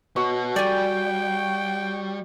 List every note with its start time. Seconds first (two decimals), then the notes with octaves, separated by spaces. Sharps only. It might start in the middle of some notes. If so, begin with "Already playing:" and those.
0.16 B3 F#4 C#5 D#5
0.56 G3 D5 G5 G#5